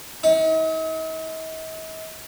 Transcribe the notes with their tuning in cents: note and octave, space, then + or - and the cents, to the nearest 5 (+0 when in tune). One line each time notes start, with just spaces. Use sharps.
D#4 +45